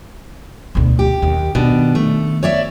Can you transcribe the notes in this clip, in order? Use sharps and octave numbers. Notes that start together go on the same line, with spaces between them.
D2 B2
G4
D#2
B2 D#3 D4
A3
C#5 D5 E5